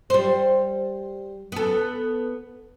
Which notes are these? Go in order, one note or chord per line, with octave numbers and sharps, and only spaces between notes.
G3 C5
B3 A4